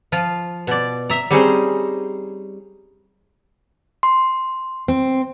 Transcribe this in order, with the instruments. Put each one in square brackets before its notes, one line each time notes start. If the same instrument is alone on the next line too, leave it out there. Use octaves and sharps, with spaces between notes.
[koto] F3 F4
B2 D5
E5 A#5
G3 C4 C#4 D#4 G#4 C5
[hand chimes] C6
[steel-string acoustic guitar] C4